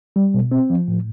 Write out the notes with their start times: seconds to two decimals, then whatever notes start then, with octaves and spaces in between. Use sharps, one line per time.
0.16 G3
0.34 B2
0.52 C4
0.70 F3
0.88 A2